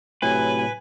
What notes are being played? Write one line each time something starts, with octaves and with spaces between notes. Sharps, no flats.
A2 C3 F#3 B4 G#5